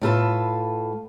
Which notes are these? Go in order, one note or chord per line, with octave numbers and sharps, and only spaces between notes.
A2 A3 F4 A4 B4 A5